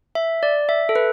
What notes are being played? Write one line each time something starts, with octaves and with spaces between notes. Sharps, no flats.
E5
D5
E5
A4
B4